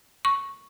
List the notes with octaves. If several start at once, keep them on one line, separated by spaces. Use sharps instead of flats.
C#6